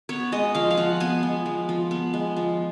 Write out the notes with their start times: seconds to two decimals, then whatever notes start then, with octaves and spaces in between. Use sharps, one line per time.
0.09 B3 C#5
0.32 G#3 D#5
0.55 F3 F5
0.71 F5
0.77 F3 F#5
1.00 B3 G#5
1.23 G#3
1.46 F3
1.69 F3
1.91 B3
2.14 G#3
2.36 F3